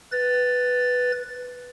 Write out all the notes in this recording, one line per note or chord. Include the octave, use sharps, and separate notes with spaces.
B4 A6